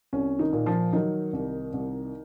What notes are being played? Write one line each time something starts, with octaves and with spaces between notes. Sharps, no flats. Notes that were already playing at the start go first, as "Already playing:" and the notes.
C2 C#4
D#3 D#4
A#2
F3 F4
D#3 F#3 D#4
C2
C2